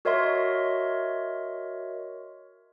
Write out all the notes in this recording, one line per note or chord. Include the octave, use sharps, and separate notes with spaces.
F#4 A#4 C#5 D#5 E5 C6